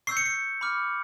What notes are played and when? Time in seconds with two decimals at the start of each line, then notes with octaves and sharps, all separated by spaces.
0.07 C#6 E6 G6 C7
0.17 C#7
0.26 C7
0.61 B5 D6 F6